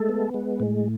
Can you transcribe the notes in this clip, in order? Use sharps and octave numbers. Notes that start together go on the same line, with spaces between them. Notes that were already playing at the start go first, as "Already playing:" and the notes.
Already playing: G#3 A3 A4
B3
G#3
A2